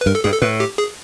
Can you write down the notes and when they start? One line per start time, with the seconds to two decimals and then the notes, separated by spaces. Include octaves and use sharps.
0.01 B4
0.06 G2 A#4
0.15 A4
0.24 G2 G#4
0.32 A4
0.42 A2 B4
0.60 G4
0.78 G#4